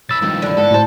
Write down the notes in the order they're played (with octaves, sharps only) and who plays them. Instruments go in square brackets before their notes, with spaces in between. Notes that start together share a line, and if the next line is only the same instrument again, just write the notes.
[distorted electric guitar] B1 B5 [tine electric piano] E6 A6
[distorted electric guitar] C#2 G2 [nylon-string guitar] D#3 F3 D#4
[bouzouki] D3 E4
[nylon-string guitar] G#2 B3 F#5 [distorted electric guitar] A4
[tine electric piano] A2 A5 [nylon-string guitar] F#4 C5